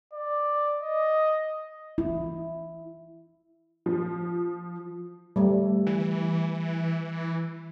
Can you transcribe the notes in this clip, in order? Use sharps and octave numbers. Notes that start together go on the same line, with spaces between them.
D5
D#5
E4
F3
G3 A3
E3